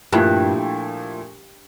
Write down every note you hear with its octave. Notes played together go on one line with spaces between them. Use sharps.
G2 A#2 F3 A3 E4